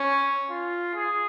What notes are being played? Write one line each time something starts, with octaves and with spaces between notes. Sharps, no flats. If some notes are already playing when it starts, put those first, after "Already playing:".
Already playing: C#4
F4
G#4